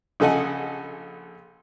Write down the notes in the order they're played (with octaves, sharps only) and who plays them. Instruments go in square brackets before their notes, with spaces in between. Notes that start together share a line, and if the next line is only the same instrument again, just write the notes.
[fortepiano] A#1 C#3 A4 D#5 F#5 G#5